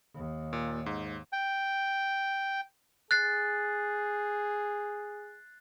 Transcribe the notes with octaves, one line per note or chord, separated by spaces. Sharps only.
D#2
A#2
G#2
G5
G#4 F#6 A6 C7